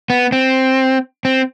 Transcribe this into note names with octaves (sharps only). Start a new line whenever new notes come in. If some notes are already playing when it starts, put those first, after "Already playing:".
B3
C4
C4